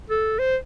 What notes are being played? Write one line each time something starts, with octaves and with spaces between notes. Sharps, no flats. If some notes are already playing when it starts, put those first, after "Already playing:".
A4
C5